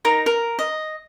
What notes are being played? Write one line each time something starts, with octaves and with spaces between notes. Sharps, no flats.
D#4 A#4 A#5
A#4
D#5